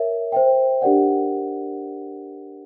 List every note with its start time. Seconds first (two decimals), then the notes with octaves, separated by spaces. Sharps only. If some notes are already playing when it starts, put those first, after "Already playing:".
Already playing: A#4 C#5 E5
0.32 C5 E5 G5
0.82 D4 G4 A#4 D5 F#5